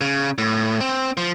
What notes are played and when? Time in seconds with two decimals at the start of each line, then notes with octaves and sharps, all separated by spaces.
0.01 C#3
0.38 A2
0.81 C4
1.17 F3